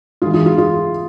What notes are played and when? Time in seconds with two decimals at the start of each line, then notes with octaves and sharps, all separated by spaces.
0.22 G#2 F4 G#4
0.26 E3
0.34 F4 G#4
0.46 F4 G#4
0.58 F4 G#4